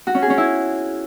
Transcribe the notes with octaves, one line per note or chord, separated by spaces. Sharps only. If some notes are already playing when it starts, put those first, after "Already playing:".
F#4
C#4
G#4
C#4
E4